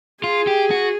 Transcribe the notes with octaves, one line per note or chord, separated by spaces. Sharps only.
F4 G#4
G4
F#4